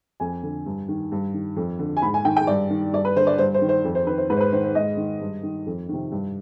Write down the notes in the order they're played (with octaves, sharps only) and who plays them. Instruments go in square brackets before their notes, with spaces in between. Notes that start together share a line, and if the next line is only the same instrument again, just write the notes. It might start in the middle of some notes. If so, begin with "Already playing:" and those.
[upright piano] F2 G#5
D3
G2
D#3
G2
D#3
F2
D3
G#5
G#2 B5
G#5
D#3 G5
G5
G2 D5
D#3
G2 D5
B4
D3 C5
D5
G2 C5
C5
D#3
C5
F2
C5
D#3 B4
C5
G#2 B4
C5
B4
D#3 C5
C5
G#2 D#5
D#3
G2
D#3
F2
C3 D#3
G2